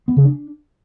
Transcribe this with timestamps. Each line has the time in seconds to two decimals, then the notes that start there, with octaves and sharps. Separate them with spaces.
0.08 B3
0.17 C#3
0.25 D4